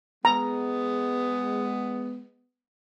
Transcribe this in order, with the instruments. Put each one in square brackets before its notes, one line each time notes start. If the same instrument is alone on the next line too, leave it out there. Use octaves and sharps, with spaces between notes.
[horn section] G#3 B3 [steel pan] A#5